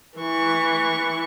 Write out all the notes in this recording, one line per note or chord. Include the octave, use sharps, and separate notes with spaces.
E3 C#6